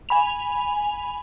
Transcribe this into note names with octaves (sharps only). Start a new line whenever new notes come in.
G#5 B5 F7